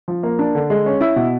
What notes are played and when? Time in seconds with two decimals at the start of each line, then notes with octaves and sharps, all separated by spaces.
0.08 F3
0.23 A#3
0.39 D4
0.55 D3
0.70 G#3
0.86 C#4
1.01 E4
1.16 B2